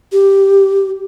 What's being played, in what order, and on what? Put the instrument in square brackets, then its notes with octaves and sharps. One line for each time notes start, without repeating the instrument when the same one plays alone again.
[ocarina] G4